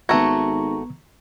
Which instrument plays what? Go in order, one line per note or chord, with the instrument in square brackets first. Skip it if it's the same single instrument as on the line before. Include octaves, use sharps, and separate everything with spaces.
[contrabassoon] G#1 [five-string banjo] A3 F#4 [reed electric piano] B3 G#6 [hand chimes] A#5 C#6